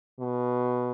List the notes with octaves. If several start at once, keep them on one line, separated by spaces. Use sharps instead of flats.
B2